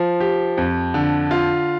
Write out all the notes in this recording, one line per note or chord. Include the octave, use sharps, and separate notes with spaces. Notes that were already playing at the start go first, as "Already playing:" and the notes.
Already playing: F3
G4
F2
D3
F4